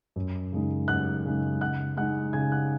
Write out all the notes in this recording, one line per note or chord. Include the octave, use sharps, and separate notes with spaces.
F#2
C#3 G#3 D#4
F#2 F#5 F#6
C#3 G#3 D#4
C#3 F#5 F#6
G#3 D#4 F#5 F#6
C#3 G#5 G#6
F#5 F#6